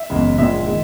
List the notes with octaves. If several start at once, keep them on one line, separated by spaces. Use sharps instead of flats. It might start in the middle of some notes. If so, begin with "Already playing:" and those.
Already playing: E5
F#1 E2 C#3 G#3
A#1 A#2 G#3 E5
D#3 G#3